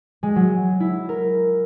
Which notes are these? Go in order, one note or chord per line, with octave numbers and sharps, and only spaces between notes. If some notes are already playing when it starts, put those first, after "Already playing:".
G#3
F#3
E4
A#4